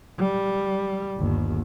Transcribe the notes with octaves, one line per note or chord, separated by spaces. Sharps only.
G3
G1 D#2